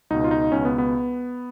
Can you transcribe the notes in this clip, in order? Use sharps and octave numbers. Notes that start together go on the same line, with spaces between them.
C#2 B2 D#4
F4
D#4
C#2 B2 C#4
B3
B3